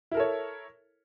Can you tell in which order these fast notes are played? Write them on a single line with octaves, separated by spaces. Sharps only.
E4 A#4 A4 C#5